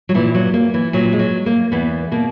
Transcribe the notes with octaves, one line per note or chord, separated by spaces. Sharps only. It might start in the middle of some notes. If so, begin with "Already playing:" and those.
F#3
A#2 E3
F#3
A#3
E3
A#2 F#3
G#3
F#3
A#3
E2 B3
B2 A#3